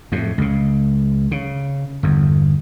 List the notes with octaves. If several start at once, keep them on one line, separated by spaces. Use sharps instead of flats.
F2 A2
C#2 C#3
C#3
G1 E2